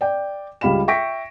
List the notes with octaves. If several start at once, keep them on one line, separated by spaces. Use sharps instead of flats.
D5 G5
C#2 G3 F5 B5 E7
E5 G5 C#6 A#6 B6 D7